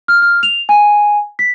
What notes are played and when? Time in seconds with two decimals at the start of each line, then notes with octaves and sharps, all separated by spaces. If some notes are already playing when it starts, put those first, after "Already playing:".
0.08 F6
0.22 F6
0.43 F7
0.69 G#5
1.39 B6